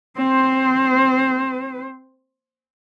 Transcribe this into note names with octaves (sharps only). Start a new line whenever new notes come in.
C4 C5